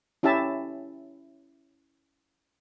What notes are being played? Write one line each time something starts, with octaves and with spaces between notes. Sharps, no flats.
C#4 E4 G4 E5 A5